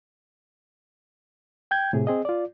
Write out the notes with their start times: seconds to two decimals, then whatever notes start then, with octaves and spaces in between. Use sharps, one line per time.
1.71 G5 G6 G#6
1.93 A2 C3 G#4
2.07 C4 G#4 D#5
2.25 F4 D5